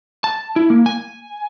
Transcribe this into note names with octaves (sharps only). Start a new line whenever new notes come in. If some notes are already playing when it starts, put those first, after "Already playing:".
A5
E4
A#3
G#5